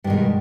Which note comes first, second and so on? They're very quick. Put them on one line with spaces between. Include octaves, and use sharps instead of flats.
G2 D#3 B2 G#3